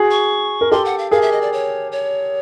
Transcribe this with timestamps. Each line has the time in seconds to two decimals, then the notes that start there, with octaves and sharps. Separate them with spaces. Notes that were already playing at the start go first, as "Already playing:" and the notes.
Already playing: F#4 G#4
0.11 C#6
0.61 A#4
0.71 G4 A4 C6
0.85 F#5
0.98 F5
1.11 G#4 A#4 F5
1.22 E5
1.32 D#5
1.41 D5
1.53 C#5
1.92 C#5